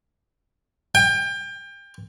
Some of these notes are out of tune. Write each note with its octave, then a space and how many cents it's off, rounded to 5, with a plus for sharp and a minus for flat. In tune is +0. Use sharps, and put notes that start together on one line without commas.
G5 +30